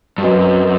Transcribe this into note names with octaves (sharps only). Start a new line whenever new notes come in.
G2
F#2 C4 F#4 B4 D#5